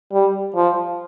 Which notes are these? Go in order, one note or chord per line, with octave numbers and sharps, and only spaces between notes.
G3
F3